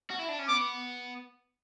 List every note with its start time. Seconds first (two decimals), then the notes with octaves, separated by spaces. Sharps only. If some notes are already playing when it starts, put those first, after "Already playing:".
0.10 F#4
0.19 E4
0.29 D4
0.39 C#4
0.48 B3 D6